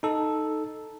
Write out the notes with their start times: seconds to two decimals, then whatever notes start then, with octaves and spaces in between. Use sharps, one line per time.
0.03 D#4 A4